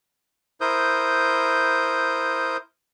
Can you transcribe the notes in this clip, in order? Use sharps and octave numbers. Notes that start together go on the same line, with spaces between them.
E4 A#4 C5 D#6 G6